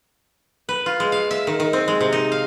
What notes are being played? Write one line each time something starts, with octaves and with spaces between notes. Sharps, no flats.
B4
F4
G#3
F5
E5
D#3
D#3
C4
G#3
C3
D#4
F5